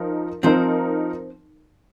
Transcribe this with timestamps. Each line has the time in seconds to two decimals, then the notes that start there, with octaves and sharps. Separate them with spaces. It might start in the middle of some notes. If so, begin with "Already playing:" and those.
Already playing: F3 D#4 A#4
0.43 F3 C4 D#4 A#4 C5